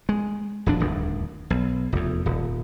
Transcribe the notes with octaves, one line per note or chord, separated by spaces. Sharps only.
G#3
D#1 F2 D4
D#1 D2 G2
B1
F1 E2
D#1